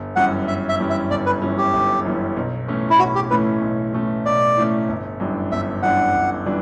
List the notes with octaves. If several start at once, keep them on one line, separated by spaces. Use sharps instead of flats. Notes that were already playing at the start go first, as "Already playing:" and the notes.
Already playing: G1
F#2 E3 G3 C#4 F#5
G1 E5
E5
F#2 E3 G3 C#4
E5
G1 D5
B4
F#2 E3 G3 C#4
G4
G1
F#2 E3 G3 C#4
B1
A2 E3 A3 C#4
E4
B1 F#4
G4
A2 E3 A3 C#4 B4
B1
A2 E3 A3 C#4
B1 D5
A2 E3 A3 C#4
G1
F#2 E3 G3 D4
G1 E5
F#2 E3 G3 D4 F#5
G1
E3 G3 D4